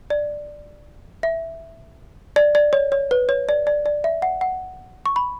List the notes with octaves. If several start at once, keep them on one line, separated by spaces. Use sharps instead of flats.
D5
E5
D5
D5
C#5
C#5
B4
C#5
D5
D5
D5
E5
F#5
F#5
C#6
B5